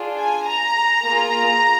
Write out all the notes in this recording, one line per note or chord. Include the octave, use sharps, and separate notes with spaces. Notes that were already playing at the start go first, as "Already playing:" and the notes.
Already playing: D4 F4 G#4
G#5
A#5
A#3 F4 G#4 A#5